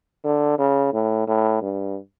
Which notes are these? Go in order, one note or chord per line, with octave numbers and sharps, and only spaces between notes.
D3
C#3
A2
A2
G2